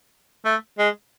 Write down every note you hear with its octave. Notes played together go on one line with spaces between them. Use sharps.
A3
G#3